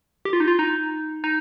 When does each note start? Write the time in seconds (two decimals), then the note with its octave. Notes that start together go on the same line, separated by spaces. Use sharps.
0.25 G4
0.33 F4
0.40 D#4
0.48 F4
0.59 D#4
1.24 D#4